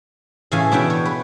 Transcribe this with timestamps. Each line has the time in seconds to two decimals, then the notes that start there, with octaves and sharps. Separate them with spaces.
0.52 A2 C#3 E3 A3 F5 G#5
0.72 B2 D4 F#4 C#5 E5 G5
0.90 C#5
1.05 B4